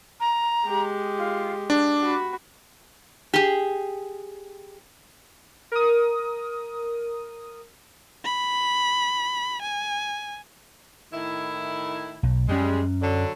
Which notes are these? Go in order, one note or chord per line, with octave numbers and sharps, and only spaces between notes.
A#5
G#3 G4
F4
D4 D6
F#4 B5
G4 G#4
A#4 D#6
B5
G#5
A2 D#3 E4
B1
F#2 G3 G#3 C#4
D3 F#3